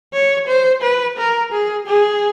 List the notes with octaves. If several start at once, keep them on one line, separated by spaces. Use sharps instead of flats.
C#5
C5
B4
A#4
G#4
G#4